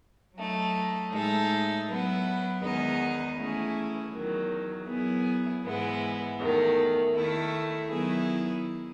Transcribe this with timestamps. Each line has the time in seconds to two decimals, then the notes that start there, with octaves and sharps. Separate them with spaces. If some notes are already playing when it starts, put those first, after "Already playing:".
0.36 F#3 A3 D#4
1.12 A2 G#3 D#4 A4 E5
1.87 F#3 B3 E4
2.62 E2 D#3 G#3 B3 D#4
3.37 E3 A3 C#4 E4 G#4
4.13 E2 D#3 F#3
4.88 F#3 B3 E4 G#4
5.64 G#2 E3 G#3 B3 E4
6.40 E2 D#3 A3
7.14 D#3 A3 E4 A4
7.90 D#3 F#3 B3 E4 G#4